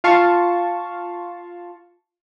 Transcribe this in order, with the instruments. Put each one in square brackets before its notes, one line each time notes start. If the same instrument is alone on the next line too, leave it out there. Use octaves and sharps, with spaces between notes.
[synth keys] F4 F5 A5 C#6